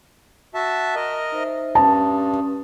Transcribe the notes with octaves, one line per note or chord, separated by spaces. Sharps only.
F#4 E5 A5
A#4 D#5
D#4 C5 E5
G2 C#4 A5 D#6